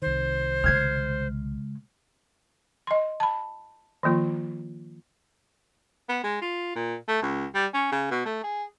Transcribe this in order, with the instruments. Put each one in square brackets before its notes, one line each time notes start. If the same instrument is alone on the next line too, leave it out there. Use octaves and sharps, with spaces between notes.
[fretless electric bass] C2 D#3 [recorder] C5
[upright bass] C#3 G#3 [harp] F6 G#6 C7
[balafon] D#5 C6
A5 B5
D#3 F3 A#3 F4
[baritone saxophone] B3
G#3
F4
A#2
A3
C#2
G3
C#4
C#3
B2
A3
G#4